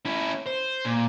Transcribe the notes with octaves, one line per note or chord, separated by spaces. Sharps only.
C#4 E4
C5
A#2